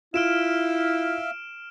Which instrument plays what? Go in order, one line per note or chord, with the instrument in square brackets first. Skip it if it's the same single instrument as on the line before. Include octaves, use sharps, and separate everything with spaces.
[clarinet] E4 [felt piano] F4 [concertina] E5 F5 [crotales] F6 D7 E7